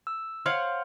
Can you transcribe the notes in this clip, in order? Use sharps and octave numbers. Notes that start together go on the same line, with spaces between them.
E6
C5 C#5 F5 F#5 C6 F6